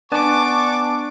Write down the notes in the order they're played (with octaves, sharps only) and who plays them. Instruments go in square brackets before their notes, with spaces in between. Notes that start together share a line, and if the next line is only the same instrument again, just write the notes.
[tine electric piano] B3 G#5 A5 [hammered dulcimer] D4 [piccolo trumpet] C#6 [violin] D6 A6